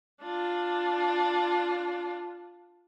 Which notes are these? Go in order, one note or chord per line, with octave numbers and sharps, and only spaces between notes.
D4 F4